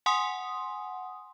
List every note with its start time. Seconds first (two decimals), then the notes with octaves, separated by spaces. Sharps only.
0.06 F#5 G#5 C6 D#6